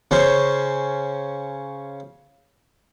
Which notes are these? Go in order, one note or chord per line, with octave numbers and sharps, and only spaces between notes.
C#3 C#4 C5